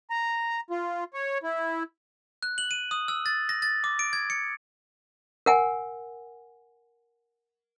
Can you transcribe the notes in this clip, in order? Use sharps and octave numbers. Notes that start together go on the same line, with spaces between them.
A#5
F4
C#5
E4
F#6
F#7
D#7
D#6
E6
A6
A#6
A6
D6
D7
G#6
C#7
A#4 F#5 G#5